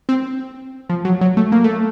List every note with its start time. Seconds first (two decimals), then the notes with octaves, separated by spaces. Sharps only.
0.09 C4
0.89 F3
1.05 F#3
1.21 F#3
1.37 A3
1.52 A#3
1.64 A3